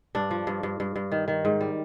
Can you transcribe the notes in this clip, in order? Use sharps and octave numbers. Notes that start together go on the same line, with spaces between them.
G2 D4
F3
G2
G2
G2
G2
D#3
D#3
G#2
G3